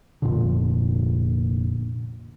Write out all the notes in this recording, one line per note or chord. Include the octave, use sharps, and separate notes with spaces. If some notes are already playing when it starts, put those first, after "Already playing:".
F1 A#2 D3